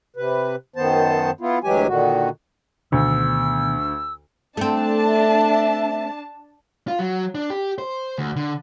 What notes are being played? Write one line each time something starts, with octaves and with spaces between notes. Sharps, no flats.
C3 B4
F#2 D#3 B3 C5 A5
B3 E4 F4
D2 E3 F#3 G#3 G4 G#5
A#2 D3 D#3 F#4
D2 B2 D#3 B3 E6
A3 C4 D4 A5
E5
F4
F#3
D4
G4
C5
D2
D3